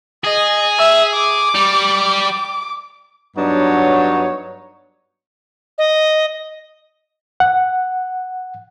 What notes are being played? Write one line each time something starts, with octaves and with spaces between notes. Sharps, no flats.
G#4 D#5
E5
D6
G3
G2 F#3 B3 D4 D#4 C#5
D#5
F#5